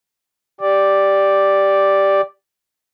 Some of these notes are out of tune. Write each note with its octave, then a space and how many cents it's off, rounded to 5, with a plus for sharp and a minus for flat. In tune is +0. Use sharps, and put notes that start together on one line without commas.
G4 +0 D5 +0